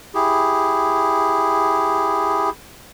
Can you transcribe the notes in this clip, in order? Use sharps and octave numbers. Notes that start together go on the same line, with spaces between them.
E4 G4 G#4